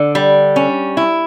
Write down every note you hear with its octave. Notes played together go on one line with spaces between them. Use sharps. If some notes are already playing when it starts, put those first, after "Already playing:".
Already playing: D3
G3
C#4
E4